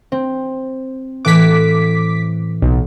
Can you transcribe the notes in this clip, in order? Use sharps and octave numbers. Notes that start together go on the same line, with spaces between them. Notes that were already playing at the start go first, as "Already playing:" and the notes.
C4
A2 E3 D6 F#6 B6
B1